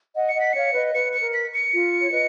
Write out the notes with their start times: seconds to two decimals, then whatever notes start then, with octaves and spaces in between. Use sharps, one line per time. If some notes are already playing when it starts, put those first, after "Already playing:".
0.15 D#5 F#5
0.29 C#7
0.35 D#5 F#5
0.41 B6
0.53 C#5 F5 C#7
0.74 B4 D#5
0.94 B4 C#7
1.14 C#7
1.20 A#4
1.34 B6
1.54 C#7
1.73 F4
2.02 C#5
2.12 B4 D#5